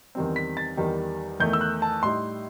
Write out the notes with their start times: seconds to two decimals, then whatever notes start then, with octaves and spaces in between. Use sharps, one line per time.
0.15 E2 D#3 G3 C4
0.36 B6
0.57 A6
0.77 E2 D#3 G3
1.40 E2 D#3 A3 G6
1.53 E6
1.61 F#6
1.82 A5
2.03 A2 G3 D#4 C6